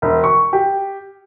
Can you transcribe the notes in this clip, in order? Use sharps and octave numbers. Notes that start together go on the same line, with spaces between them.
E1
C#6
G4